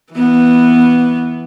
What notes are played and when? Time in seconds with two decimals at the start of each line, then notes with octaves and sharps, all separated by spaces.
0.13 E3 B3